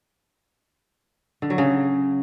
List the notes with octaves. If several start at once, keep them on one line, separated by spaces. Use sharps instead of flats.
D3
F#3
C#3